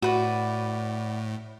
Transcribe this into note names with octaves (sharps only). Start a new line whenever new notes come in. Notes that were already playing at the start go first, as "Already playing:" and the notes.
A2 F#4 B4 D5